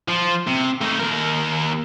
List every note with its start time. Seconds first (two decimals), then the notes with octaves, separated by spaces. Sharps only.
0.08 F3
0.47 C3
0.81 A3 D#4
0.99 D#2 A#4